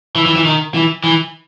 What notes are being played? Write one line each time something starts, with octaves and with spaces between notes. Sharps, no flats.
E3
E3
E3
D#3
E3
E3